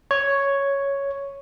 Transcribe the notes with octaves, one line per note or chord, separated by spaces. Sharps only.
C#5